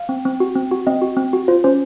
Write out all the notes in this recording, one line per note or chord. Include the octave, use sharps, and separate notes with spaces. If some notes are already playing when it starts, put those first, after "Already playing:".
Already playing: F5
C4
C4
F#4
C4
F#4
C4 D#5
F#4
C4
F#4
F4 C5
C#4 C5